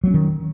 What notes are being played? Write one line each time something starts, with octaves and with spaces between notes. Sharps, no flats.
D#3 F#3 B3 C#4